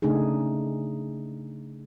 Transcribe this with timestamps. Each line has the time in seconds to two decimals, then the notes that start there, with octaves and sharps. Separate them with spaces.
0.02 C#3 A3 D4 D#4 G#4